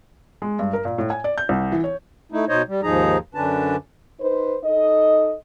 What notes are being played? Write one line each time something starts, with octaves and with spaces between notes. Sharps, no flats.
G#3
G2
A#4
A#2
A2
G#5
D5
G6
C2
E3
C#5
A3 D#4 E4
B2 D#4 C5 C#5 D#5
G3
D#2 G#2 F3 D#4 G#4 A#5
F#2 D3 C#4 D4 B4 A5
D#4 B4 C5
D#4 A4 D#5